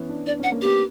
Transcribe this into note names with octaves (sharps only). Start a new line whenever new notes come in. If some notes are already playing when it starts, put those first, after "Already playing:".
Already playing: E3 B3 C#4
D4
D4 D5
C#4 F#5
A#3
B3 G4